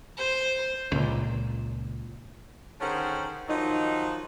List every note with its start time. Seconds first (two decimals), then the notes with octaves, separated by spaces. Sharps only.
0.17 C5
0.92 C#2 A#2
2.80 D3 D#3 C#4 G#4 C5 F#5
3.49 D#3 F3 F#3 D#4